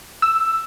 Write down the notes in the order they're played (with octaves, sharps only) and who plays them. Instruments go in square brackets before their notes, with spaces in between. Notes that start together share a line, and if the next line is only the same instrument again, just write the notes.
[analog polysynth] E6